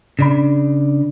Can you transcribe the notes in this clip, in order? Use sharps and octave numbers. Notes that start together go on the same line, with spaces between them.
C#3 D4 B5